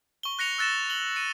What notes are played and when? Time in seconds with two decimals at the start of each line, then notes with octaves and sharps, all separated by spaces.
0.23 C#6 G7
0.39 F#6 A#6 C#7 F7
0.58 E6 F#6 A6 A#6 E7
0.90 F#7 G7
1.16 C#7 D#7